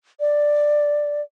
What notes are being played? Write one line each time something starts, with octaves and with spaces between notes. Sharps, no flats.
D5